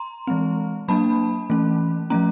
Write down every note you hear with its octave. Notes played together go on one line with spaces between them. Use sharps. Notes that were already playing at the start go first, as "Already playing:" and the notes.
Already playing: A#5 C6
E3 G#3 C4
F#3 A#3 D4 A5 B5
E3 A3 C#4
F3 A3 C#4 A#5